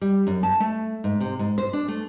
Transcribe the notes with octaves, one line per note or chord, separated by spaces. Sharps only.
G3
F#2
A5
A3
G#2
C3
G#2
C5
D4
A3